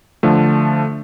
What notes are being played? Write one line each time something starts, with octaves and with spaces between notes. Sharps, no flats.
D3 F3 A3